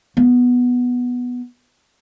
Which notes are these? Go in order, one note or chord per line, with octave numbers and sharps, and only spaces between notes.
B3